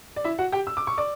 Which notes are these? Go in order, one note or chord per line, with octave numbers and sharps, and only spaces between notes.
D5
E4 E5
F#4 F#5
G4 G5
E6
D6
C#6
D5 D6